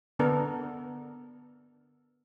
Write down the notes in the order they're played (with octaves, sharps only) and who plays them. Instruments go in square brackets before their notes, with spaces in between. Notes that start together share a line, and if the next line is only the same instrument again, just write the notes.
[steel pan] D3 B3 D4 A4 A#4